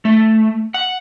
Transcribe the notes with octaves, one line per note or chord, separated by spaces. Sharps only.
A3
F#5